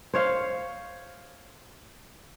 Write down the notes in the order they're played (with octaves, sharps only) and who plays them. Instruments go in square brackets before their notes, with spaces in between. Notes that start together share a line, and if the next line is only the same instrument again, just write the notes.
[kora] C5 C#5 F5